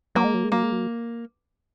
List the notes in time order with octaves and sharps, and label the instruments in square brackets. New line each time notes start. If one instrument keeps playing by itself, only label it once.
[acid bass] F#3 [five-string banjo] A#3
[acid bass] G#3
F#3
G#3
[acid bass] F#3 [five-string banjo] A#3
[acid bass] G#3
F#3